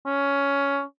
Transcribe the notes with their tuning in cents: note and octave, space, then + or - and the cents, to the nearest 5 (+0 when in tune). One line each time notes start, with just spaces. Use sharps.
C#4 +10